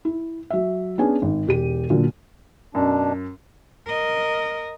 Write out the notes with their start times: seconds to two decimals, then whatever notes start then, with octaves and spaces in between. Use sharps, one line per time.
0.05 E4
0.50 F#3 E5
0.98 B3 C#4 D4 G#4 G#5
1.22 G#1
1.47 E1 G4 D#7
1.90 A#2 D3 F#3
2.75 F#2 B2 D4
3.87 A#4 D#5